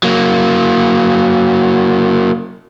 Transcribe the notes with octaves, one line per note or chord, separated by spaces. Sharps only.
F#3 A#3